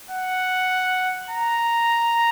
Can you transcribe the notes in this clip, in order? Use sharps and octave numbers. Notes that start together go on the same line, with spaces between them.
F#5
A#5